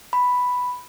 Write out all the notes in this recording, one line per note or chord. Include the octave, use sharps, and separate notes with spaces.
B5